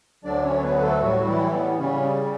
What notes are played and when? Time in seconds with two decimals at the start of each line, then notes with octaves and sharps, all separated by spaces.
0.24 D2 D3 F#3 D4 D5
0.43 C#4 C#5
0.63 B3 B4
0.82 A3 A4
1.01 A2 F#3 G3 F#4
1.27 E3 E4
1.53 B3
1.78 C#3 G3 C#4